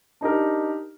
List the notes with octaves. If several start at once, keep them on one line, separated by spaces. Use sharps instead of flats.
D4 D#4 G4 A#4